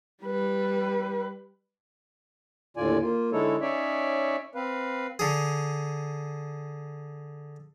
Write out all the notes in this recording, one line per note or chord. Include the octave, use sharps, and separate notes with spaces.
G3 B4
D#2 A2 D3 F4 D5 G#5
A#3 F4
D3 G#3 D#4 E4 A4 C#5
C#4 D#4 C#5 D5 E5
C4 B4 F5
D3 G#4